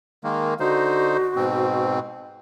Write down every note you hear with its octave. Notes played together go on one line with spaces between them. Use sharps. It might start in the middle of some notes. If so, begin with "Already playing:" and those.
D#3 G#3 A#3
D3 D#4 F#4 C5
G#2 B2 C4